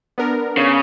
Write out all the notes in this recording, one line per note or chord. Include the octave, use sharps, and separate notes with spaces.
B3 D4 A#4
C#3